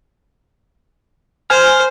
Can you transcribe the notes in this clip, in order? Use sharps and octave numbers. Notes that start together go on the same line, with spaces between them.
C5 G#5 F6